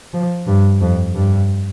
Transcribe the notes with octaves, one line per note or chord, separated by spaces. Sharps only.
F3
G2
F2
G2